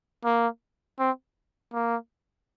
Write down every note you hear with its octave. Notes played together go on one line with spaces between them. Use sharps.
A#3
C4
A#3